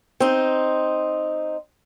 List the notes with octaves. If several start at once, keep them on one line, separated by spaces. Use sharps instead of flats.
C4 D#4